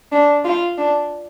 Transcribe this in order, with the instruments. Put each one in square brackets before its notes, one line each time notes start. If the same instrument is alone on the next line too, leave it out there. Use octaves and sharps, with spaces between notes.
[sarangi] D4
F4
D4